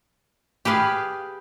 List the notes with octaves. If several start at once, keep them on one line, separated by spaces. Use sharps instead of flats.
G4 G#4 B4 F5